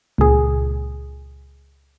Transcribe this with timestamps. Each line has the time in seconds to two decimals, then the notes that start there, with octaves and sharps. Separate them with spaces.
0.18 C#2 A#2 G#4